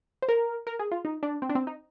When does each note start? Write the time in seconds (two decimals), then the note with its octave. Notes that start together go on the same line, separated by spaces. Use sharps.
0.22 C5
0.29 A#4
0.67 A#4
0.79 G#4
0.91 F4
1.05 D#4
1.23 D4
1.42 C4
1.49 D4
1.55 C4
1.67 D#4